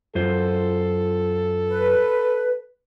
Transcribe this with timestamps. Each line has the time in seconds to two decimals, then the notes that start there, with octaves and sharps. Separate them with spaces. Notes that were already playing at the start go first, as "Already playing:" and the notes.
0.15 F#2 F4 A4 C5
1.68 B4